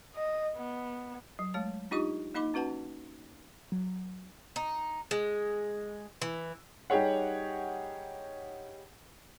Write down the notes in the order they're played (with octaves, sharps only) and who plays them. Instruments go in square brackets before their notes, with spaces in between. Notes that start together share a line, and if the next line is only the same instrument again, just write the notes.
[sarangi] D#5
B3
[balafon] F#3
G#3 A3 C#5 A5
D4 D#4 F4 G4 D#5 C#6
A#3 D#4 D#5 B5 D6
C#4 F#4 B4 F#5 A5
[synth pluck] F#3
[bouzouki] D#4
G#3
E3
[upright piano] G3 D#4 G4 G#4 C#5 F#5